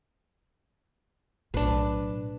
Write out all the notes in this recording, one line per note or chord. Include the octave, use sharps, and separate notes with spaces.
B1 A2 D4 B4